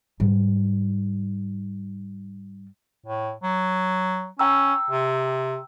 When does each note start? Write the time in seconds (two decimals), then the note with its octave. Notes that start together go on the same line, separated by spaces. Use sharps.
0.20 G#2 G3
3.06 A2
3.43 F#3
4.39 C#4 G5 A#5 E6
4.91 C3